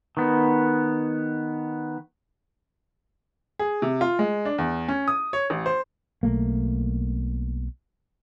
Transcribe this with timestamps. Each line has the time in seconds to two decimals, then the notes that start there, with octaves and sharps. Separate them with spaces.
0.17 D#3 B3
3.59 G#4
3.82 C3
4.01 F4
4.19 G#3
4.45 D4
4.58 E2
4.88 C#4
5.08 D#6
5.33 C#5
5.50 A1
5.66 C5
6.23 B1 A3 A#3